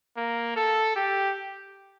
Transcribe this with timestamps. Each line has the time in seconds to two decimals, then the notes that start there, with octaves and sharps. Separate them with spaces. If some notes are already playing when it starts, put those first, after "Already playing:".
0.17 A#3
0.56 A4
0.96 G4